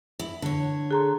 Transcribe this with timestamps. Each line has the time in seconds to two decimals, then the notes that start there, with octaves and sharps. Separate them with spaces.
0.19 E4
0.42 D3 C#5
0.91 G#4 A4 A#5 C6